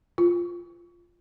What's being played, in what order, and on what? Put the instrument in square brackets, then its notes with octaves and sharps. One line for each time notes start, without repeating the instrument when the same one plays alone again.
[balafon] F4